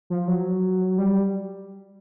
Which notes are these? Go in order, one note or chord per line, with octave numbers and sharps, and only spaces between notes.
F3
F#3
G3